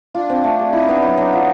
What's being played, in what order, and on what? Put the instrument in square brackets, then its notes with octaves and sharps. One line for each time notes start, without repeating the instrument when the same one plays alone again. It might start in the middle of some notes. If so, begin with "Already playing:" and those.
[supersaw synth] D4 [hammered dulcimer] F4
[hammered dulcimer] C4
A3
G#4
[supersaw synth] D#4 [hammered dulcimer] E4
[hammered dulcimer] B3
F#3
F#3
F4